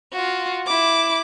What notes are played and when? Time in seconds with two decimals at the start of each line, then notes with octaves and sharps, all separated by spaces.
0.13 F4 F#4
0.67 E4 D6